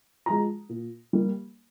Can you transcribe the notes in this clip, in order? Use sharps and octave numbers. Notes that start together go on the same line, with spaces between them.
F3 G#3 A#5
A#2
G3 A#3